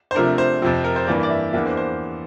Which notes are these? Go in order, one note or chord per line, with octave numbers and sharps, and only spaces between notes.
C5
C3 F3 A3 D4 A#4
C5
F2 C3 F3 C4
A#4
C5
G2 E3 A#3 D5
D5
E5
E2 E3 A#3 D4 E5
C5
C5